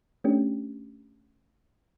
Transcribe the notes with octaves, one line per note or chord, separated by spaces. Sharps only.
A3 C#4 D4 G4